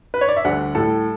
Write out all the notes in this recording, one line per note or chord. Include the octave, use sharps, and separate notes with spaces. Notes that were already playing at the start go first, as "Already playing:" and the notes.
B4
C#5
D5
E5
D2 D3 G3 F#5
A2 G3 A4